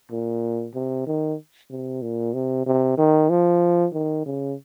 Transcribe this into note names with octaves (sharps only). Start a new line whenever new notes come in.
A#2
C3
D#3
C3
A#2
C3
C3
D#3
F3
D#3
C#3